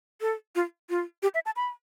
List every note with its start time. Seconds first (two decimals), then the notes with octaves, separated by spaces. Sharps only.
0.21 A4
0.55 F4
0.90 F4
1.23 G4
1.34 E5
1.46 A5
1.56 B5